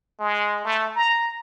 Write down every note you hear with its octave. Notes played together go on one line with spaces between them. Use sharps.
G#3
A3
A#5